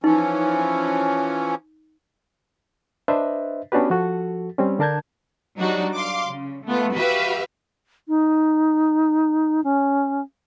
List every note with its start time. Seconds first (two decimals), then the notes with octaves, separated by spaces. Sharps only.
0.04 E3 F3 C#4 D#4
3.08 D4 B4 C5 D#5 E5
3.72 B3 C#4 D4 F#4 G4 B4
3.90 F3 F#4 A4
4.58 G3 C4 C#4
4.79 D3 D4 A#4 A5 G6 G#6
5.59 F#3 G3 D4 D#4 F#4
5.96 F5 C6 D6
6.28 C#3
6.65 A3 B3 F4
6.95 F#4 G4 B4 E5 F5
8.08 D#4
9.64 C#4